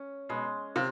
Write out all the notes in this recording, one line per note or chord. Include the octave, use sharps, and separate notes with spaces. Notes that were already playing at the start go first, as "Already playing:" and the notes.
Already playing: C#4
B2 G#3
C3 F4